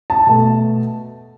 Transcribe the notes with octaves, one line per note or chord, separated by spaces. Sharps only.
A5
B2 A3